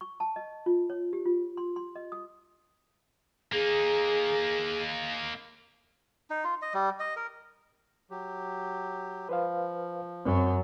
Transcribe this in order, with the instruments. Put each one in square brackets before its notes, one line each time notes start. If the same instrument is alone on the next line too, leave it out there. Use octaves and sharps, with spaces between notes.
[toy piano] C#6
A5
D#5
F4
C#5
G4
F4
C6
C6
D#5
D#6
[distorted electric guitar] A#3 D#4 [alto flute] G#4
[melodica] D#4
F4
D#5
G3
D#5
A#4
[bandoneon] F#3 G4
[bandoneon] F3 [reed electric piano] B4 C5 F5
[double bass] F#2 F#3 [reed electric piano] C4